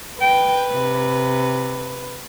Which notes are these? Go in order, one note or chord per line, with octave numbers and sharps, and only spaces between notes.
B4 G5
C3